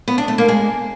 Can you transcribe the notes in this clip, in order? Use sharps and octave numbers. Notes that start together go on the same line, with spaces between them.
B3
D4
A3
A#3
G#3